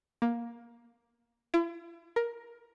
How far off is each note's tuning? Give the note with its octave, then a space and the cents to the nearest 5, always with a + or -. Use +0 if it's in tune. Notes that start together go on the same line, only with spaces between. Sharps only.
A#3 +15
E4 +45
A#4 +15